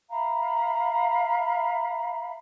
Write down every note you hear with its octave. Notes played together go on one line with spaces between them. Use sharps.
E5 F5 A#5 B5